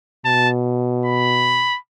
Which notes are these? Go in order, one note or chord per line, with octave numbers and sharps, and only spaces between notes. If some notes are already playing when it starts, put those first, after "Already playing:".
B2 A5
B5